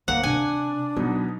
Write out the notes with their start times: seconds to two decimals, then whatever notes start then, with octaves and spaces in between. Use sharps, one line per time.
0.08 D2 A#3 F#5
0.24 C3 D4 G#5
0.96 B2 F#3 B3 D#4